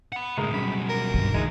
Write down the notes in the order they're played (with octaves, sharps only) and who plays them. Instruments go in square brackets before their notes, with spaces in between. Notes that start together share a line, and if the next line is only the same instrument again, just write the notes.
[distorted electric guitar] F#5 B5
[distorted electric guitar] C#2 A2 [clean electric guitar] G#3 A#4
[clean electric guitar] F#2 [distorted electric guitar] B2 G3 [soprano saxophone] B5
[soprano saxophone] A#4
[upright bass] G2 D3
[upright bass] F2 [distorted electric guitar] D3 E3 [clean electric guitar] G#3 D#4